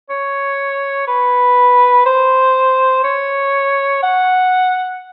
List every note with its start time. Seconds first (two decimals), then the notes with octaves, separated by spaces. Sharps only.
0.10 C#5
1.07 B4
2.06 C5
3.04 C#5
4.03 F#5